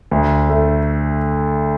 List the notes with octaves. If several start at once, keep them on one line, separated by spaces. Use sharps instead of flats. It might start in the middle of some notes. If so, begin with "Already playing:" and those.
D2
A3